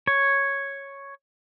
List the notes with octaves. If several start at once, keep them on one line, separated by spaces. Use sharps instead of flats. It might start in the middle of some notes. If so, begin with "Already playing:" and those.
C#5